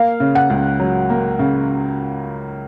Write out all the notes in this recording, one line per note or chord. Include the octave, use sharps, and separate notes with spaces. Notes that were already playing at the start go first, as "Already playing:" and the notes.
Already playing: A#3 F5
C#3
F#5
C#2
F#3
A#3
C#3